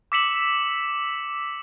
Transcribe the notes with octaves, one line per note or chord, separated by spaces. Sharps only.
D6 E6 B6 C#7 E7 F#7